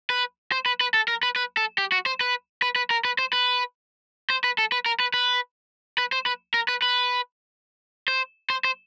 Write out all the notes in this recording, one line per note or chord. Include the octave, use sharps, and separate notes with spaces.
B4
C5
B4
B4
A4
A#4
B4
B4
A4
G4
F#4
C5
B4
B4
B4
A#4
B4
C5
B4
C5
B4
A4
B4
A#4
B4
B4
B4
C5
B4
A#4
B4
B4
C5
C5
C5